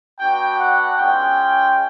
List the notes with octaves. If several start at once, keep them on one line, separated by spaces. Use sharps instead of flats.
B3 D4 F#4 G5
F#5
G#3 C#4 F4 G5